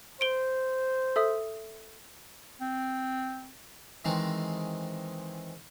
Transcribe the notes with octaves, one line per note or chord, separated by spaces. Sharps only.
C5 D7 G7
A4 E5 D#6
C4
D#3 E3 G#3 C4 D#4